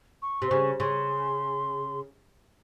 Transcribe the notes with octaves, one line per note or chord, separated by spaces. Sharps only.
C#6
C3 C6
C#3 C#6
C#3 C6